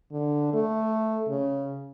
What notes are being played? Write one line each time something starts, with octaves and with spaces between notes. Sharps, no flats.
D3
A3
C#3